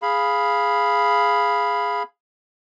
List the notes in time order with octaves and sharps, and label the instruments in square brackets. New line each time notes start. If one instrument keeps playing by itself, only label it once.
[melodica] G#4 F5 B5